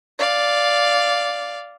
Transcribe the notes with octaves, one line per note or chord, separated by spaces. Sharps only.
D5 F5